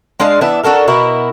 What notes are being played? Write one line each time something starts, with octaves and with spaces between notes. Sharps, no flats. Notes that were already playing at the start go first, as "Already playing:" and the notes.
G#3 D4 G#4 F5
E3 B3 D4 E5
D4 F#4 A4 A#4
B2 E4 F#4 A#4